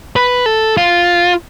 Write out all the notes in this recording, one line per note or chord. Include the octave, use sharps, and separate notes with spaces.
B4
A4
F4